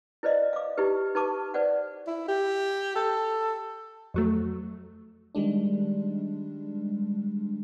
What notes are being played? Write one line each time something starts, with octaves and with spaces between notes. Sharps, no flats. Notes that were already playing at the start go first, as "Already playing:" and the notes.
E4 B4 C5 D5 D#5 F5
F5 D6
D#4 E4 G4 B4
D#4 B4 A5 C#6 D6
B4 C5 D5 F#5
E4
G4
A4
F2 F#3 A3
D#3 G3 G#3 D4